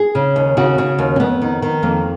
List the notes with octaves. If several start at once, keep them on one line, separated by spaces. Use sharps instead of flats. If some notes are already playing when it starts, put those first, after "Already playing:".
Already playing: G#4
C#3
D#2
C#3 F#4
C#3
D#2
C#4
F2 B3
D#3
D#3
F2 A#3